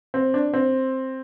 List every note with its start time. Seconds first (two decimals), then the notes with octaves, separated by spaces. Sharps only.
0.14 C4
0.34 D4
0.54 C4